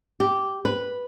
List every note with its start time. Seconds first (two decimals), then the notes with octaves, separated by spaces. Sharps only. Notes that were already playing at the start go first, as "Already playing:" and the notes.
0.20 G4
0.65 B4